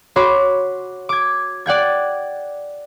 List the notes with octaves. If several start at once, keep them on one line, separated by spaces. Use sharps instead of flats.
F#4 C#5 B5 C6 D6
D6 G#6
D5 F#5 G5 G#6